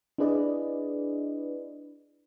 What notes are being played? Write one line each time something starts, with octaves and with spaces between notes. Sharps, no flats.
D4 E4 G#4 B4 D5 D#5